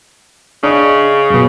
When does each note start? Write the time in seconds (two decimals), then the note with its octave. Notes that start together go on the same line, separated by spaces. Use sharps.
0.63 C#3 D4 D#5
1.30 F#2 B2